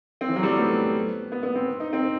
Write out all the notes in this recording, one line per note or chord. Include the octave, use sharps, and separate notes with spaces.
C4
E3
F#3
G3
A3
B3
B3
B3
C4
D#4
C4